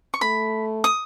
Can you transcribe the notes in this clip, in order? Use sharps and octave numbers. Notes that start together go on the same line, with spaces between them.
C#6
A3 B5
D#6